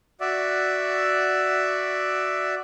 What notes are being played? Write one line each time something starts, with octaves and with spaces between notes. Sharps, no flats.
F#4 D5 E5